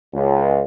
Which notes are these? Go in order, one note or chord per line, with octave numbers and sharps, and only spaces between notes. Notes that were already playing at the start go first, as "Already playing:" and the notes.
C#2